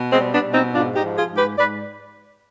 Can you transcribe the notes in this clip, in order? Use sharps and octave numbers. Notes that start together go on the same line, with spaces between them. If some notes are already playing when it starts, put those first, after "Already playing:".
Already playing: B2
G#3 C4
G3
B3 D4
B2
C4 D#4
G#2 D4 F4
D#4 G4
F3
F4 G#4
G#2
G4 B4
G#2 B4 D5